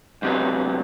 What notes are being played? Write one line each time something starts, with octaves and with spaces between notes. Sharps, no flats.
C#2 F#2 C3 F#3 B3